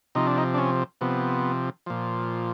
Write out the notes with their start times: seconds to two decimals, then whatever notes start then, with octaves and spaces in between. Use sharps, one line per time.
0.15 C3 F3 D#4
0.27 D4
0.38 D#4
0.54 D4
0.58 C#4
1.01 C3 F3 B3
1.86 A#2 F3